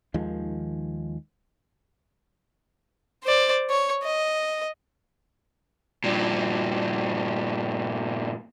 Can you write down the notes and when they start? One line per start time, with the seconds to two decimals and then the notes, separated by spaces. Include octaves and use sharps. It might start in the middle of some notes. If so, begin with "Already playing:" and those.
0.14 D#2 D#3 F3 G#3
3.24 C5 D5
3.70 C#5
4.03 D#5
6.04 G2 A#2